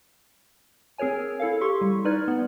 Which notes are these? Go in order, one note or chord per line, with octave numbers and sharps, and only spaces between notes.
C4 G#4 A#4 C#5 G#5
E4 A4 F5
G4 A4 C6 C#6
G3
D#4 B4 D5 F6 G#6
B3